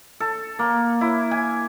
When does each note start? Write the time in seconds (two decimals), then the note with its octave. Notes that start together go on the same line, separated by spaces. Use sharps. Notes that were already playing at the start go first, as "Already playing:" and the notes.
0.20 A4
0.59 A#3
1.01 E4
1.31 G#5